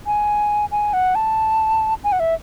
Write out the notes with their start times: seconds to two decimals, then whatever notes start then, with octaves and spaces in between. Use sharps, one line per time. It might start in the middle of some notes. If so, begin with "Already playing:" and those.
0.06 G#5
0.72 G#5
0.93 F#5
1.15 A5
2.04 G#5
2.12 F#5
2.20 E5